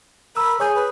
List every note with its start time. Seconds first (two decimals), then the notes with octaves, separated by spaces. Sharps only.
0.37 A#4 B5 E6
0.60 G#4 C#5 G#5 G6
0.75 B4